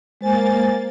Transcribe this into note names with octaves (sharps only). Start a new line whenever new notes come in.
G#3 A#3 C5 G#5 A6